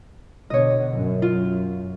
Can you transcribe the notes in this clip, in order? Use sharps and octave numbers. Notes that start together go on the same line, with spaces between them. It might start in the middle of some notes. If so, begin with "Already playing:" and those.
B2 D3 C#5 D#5
F#2
F4